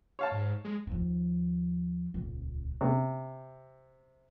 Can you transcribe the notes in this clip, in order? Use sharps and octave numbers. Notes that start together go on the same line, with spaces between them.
C#5 F5 A5
G#2
G#3
D#2 F3
D#1 C#2
C3